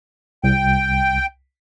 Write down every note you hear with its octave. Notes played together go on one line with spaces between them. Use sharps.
C2 G5